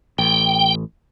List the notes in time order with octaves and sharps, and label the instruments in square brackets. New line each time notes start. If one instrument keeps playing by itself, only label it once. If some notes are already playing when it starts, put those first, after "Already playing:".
[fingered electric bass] A1 [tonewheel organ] G5